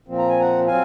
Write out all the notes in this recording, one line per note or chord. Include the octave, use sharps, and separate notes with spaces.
A#2 F3 C4
A#5
G#5
F#5 A#5
F#3 C4 F5 G#5